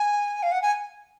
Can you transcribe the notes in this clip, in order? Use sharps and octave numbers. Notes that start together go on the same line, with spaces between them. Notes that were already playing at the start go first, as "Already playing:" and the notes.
Already playing: G#5
F5
F#5
G#5